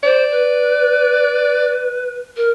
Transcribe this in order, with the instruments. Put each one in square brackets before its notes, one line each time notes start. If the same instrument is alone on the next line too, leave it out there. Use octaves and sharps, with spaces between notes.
[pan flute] C5 [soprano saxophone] D5
[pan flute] B4
A#4